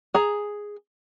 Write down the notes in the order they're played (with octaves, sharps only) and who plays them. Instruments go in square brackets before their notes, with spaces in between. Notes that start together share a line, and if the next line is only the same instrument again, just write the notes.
[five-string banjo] G#4 A#5